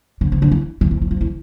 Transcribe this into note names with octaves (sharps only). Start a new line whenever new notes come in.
D3
C#3
D3
E3
D#3
E3
E3
F3
E3